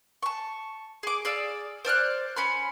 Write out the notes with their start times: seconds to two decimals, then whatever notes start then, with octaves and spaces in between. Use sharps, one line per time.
0.23 A5 C#6
1.03 G#4 D6
1.25 G#4 D5 F5 E6
1.85 C5 D5 F6 F#6
2.36 C#4 B5 C6